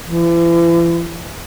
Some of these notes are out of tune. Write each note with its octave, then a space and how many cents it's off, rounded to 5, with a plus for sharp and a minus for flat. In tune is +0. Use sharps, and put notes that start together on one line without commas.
E3 +40